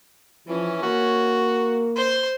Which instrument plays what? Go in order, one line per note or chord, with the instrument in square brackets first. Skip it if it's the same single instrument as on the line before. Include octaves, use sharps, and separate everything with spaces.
[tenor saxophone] E3 [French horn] F3 [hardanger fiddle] C#4
[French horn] A#3 [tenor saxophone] F#4
[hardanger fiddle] C5 C6